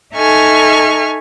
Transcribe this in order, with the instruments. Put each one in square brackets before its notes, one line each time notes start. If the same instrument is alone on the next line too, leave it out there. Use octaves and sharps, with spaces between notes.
[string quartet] D#4 A4 E5 G#5 C#6 F6